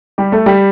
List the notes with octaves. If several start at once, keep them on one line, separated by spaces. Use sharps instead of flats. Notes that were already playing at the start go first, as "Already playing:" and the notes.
G3 G4
A3 A4
G3 G4